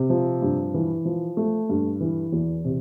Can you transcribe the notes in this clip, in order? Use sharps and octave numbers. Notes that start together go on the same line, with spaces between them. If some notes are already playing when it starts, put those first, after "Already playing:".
Already playing: C3
F3
G2
E3
F3
A3
G2
E3
E2
C3